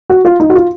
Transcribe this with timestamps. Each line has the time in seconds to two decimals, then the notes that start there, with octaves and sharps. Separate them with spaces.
0.10 F#4
0.25 F4
0.40 D#4
0.50 F#4
0.55 F4